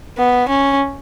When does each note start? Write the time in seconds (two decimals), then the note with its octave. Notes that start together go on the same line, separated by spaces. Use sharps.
0.18 B3
0.49 C#4